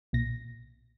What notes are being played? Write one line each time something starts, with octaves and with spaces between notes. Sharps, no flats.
B1 A#2 A#6